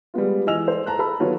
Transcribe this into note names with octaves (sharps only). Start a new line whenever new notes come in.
G3 G#3 B3 F4
E3 G#3 D#5 G#5 E6 F7
A4 C5 D5
A5 A#5 F#6
A4 A5 B5 E6
D#3 F#3 B3 F4 C#5